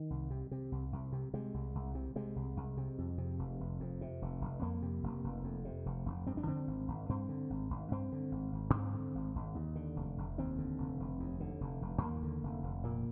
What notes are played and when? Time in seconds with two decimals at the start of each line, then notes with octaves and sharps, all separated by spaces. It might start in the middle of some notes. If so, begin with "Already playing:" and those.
Already playing: D#3
0.10 C2
0.30 C3
0.51 C3
0.72 C2
0.92 C2
1.12 C3
1.34 C3 G#3
1.54 C2
1.75 C2
1.95 C3
2.16 C3 G#3
2.36 C2
2.57 C2
2.77 C3
2.98 F2
3.18 C3
3.39 F1
3.60 F1
3.80 F2
4.01 C3
4.22 F1
4.41 F1
4.62 F2 A#3
4.82 C3
5.03 F1
5.24 F1
5.44 F2
5.65 C3
5.86 F1
6.06 F1
6.27 G2 C4
6.37 D4
6.47 D3 C4
6.68 G#1
6.88 G#1
7.09 G2 C4
7.29 D3
7.50 G#1
7.70 G#1
7.91 G2 C4
8.12 D3
8.32 G#1
8.53 G#1
8.73 G2 C4
8.94 D3
9.15 G#1
9.35 G#1
9.55 D#2
9.76 D3
9.96 F1
10.18 F1
10.38 D#2 C4
10.58 D3
10.78 F1
10.99 F1
11.19 D#2
11.40 D3
11.61 F1
11.82 F1
12.01 D#2 A#3
12.23 D3
12.43 F1
12.64 F1
12.84 A#2 A#3